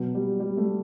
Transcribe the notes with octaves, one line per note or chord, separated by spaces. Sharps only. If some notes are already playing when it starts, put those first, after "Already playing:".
Already playing: B2 F#3
G3
G3
A3